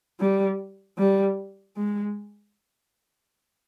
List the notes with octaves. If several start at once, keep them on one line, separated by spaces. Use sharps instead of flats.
G3
G3
G#3